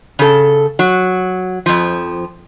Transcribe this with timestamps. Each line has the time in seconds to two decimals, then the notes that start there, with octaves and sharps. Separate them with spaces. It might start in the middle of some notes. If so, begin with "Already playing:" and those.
0.19 C#3 A4
0.79 F#3
1.66 F2 F3